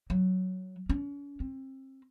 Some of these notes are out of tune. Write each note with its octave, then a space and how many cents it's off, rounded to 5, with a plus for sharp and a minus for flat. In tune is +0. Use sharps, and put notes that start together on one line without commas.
F#3 +5
C#4 +40
C4 +30